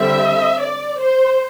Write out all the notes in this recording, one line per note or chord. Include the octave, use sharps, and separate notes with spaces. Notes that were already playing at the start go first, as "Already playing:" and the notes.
Already playing: D3 G3 C4 E5
D5
C5